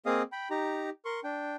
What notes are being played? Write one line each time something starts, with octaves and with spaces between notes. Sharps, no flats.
A#3 C4 G#4 D#5 F5 D#6
G5 B5
D#4 G4 A#5
A#4 C6 C#6
D4 G5